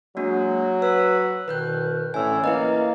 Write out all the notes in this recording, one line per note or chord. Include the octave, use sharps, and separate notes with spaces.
F#3 G#3 A#3 D4 F#4
B4 E6
C2 B2 D#3 B4 F#6 G6
A2 D3 E3 C#4 G#5 E6
A#3 E4 B4 D#5